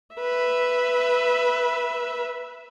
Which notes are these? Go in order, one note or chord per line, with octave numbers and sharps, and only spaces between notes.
B4 E5